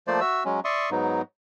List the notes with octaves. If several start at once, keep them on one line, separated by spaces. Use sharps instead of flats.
F3 A3 A#3 C5 D5
F#4 E5 E6
F#3 G#3 C#4
D5 E5 C6 C#6 D#6
G#2 F#3 B3 D#4